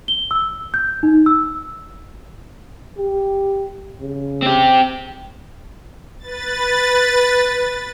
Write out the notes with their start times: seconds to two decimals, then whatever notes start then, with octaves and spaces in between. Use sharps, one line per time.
0.08 G7
0.31 E6
0.74 G6
1.03 D#4
1.26 E6
2.98 G4
4.01 C#3
4.42 C4 G4
6.19 B4 A6